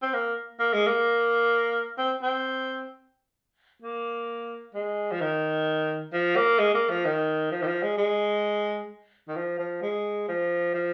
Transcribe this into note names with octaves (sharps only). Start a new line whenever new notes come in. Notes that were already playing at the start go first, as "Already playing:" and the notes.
C4
A#3
A#3
G#3
A#3
C4
C4
A#3
G#3
F3
D#3
F3
A#3
G#3
A#3
F3
D#3
F3
D#3
F3
G#3
G#3
D#3
F3
F3
G#3
F3
F3